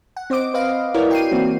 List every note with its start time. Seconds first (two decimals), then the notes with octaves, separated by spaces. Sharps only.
0.17 F#5
0.30 C4 C5 D#5 D6 D7
0.54 B4 D#5 F5
0.94 E4 F#4 A#4 B4 C#5 D5
1.11 G5 C7 D#7
1.31 E3 A#3 C4 D#4 F#4